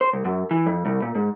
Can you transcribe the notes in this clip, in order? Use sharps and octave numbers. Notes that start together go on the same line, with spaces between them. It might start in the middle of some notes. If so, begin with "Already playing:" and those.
C5
C2
F#2
E3
F2
C2
A#2
G#2